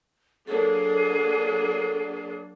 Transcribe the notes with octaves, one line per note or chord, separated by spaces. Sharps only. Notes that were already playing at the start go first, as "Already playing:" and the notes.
F#3 A#3 D4 G#4 A4